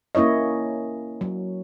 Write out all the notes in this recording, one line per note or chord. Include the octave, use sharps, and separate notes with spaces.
A#3 C#4 E4 C#5 D#5
F#3